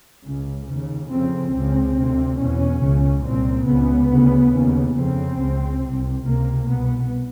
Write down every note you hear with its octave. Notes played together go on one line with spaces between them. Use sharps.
C#2 C#3
D#2 C#3
F2 C#3 C4
C#2 C#3 C4
D2 C3
E2 B2 C#4
C#2 C#3
C2 A#2 C4
C#2 C#3 B3
D2 C#3
D#2 C#3
F2 C#3 C4
C#2 C#3
C3
C2
C#2 C3 A#3
C2 B2 B3